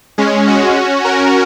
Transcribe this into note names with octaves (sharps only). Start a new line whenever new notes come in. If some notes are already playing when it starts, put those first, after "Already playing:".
G#3 C#4
C#4 F#4
F#4 A#4